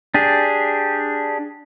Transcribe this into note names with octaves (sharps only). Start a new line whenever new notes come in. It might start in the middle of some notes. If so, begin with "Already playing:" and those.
D4 G4 G#4